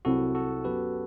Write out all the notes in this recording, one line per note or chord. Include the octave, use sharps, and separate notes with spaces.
C2 C3 F#3 C4 E4 F#4 A4
F#4 A4
F#2 F#3 B3 G4 B4